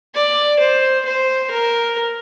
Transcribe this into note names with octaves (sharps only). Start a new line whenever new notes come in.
D5
C5
C5
A#4